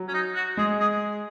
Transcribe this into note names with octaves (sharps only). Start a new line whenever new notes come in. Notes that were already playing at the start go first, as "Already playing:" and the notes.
Already playing: F#3
C#4
D#4
F#4
G#3 G#4
G#4